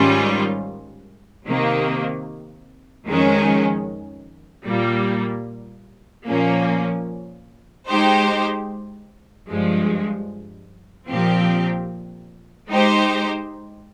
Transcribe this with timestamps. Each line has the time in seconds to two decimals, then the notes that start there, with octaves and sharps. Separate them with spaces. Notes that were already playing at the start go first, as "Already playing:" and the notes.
Already playing: G#2 D#3 G3 C#4 F4
1.45 C3 D#3 A#3
3.06 F2 D#3 G#3 C#4
4.66 A#2 G3 A#3
6.27 A#2 F3 A#3 C#4
7.88 G#3 D#4 G4 C5
9.49 G2 F3 G#3
11.09 A#2 F3 C4 G4
12.69 G#3 D#4 G4 C5